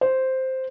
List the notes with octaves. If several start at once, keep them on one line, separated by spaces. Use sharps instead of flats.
C5